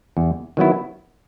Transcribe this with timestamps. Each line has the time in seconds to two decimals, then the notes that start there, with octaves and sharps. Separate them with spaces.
0.17 E2
0.57 D#3 F#3 B3 E4